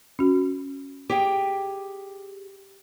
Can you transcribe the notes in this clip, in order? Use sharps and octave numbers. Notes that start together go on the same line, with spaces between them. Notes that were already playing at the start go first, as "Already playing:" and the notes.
C#4 F#4
G4 G#4 G5